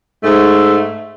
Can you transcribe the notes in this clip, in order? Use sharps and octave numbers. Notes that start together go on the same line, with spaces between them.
G#2 A3